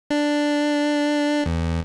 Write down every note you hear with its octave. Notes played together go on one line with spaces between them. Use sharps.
D4
E2